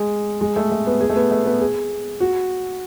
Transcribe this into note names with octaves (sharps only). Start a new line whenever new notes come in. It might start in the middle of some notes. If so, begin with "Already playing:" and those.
Already playing: G#3
G#3
A3
A3
B3
G#4
A3
B3
A3
B3
G#4
F#4